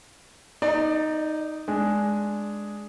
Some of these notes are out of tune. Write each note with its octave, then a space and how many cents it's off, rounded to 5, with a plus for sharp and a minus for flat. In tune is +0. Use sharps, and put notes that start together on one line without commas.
D#4 +0 D5 +25 A#5 -20
G#3 +5 D4 +0